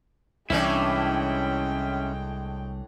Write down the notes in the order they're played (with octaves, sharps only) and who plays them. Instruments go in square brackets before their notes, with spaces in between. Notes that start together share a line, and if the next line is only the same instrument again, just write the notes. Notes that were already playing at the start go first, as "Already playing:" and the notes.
[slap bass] C2 [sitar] A2 E3 D4 [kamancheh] G#3 G5 [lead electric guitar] C#4 E4